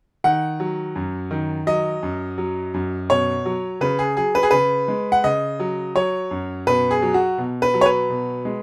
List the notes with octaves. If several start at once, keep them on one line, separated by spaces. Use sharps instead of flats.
D#3 F#5
F#3
F#2
D#3
F#3 D#5
F#2
F#3
F#2
B2 C#5
F#3
C#3 B4
G#4
F#3 G#4
B4
G#4
C#3 B4
G#3
F#5
C#3 D#5
F#3
F#3 C#5
F#2
B2 B4
G#4
F#3
F#4
B2
B4
F#3
C#5
B4
B2
G#3